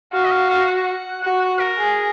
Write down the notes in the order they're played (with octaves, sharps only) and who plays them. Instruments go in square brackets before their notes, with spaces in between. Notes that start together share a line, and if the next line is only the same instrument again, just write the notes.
[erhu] F#4 [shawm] F5
[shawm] D#5
F5
F5
F#5
[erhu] F#4 [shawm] F#5
[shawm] F#5
A#4
[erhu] G#4